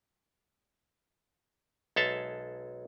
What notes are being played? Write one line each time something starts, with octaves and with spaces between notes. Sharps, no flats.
B1 G#3 A4 E5 F5 A5